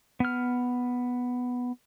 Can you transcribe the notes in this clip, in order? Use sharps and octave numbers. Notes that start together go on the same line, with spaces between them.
B3 F6